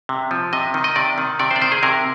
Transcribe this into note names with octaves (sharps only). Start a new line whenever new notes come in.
C3
F3
C3 D#5
D#3
D#5
C3 D5
D#3
C3 D5
C5
D5
D#3 C5
G#4
C3 A#4